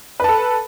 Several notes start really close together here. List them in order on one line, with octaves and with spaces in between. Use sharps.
B4 A5 A4